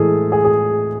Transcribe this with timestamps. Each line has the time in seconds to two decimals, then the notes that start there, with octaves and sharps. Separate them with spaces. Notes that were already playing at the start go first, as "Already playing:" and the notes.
Already playing: A2 E3 G#3 G#4 A4
0.32 G#4
0.45 G#4